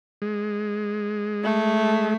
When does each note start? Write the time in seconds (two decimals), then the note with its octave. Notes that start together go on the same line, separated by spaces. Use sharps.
0.22 G#3
1.44 A3